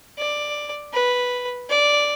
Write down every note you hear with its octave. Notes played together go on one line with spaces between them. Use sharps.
D5
B4
D5